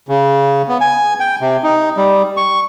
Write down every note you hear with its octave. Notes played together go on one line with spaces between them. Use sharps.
C#3
B3
G#5
G5
C3
D#4
G3
C#6